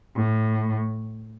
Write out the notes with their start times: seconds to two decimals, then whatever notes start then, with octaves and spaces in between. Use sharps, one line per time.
0.16 A2